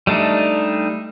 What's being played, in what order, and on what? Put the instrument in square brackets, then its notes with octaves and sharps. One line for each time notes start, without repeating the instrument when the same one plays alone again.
[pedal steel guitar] G3 A3 D4 D#4